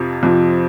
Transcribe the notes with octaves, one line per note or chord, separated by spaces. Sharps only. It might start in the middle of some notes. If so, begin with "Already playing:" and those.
Already playing: F2 C3 F3
F2 C3 F3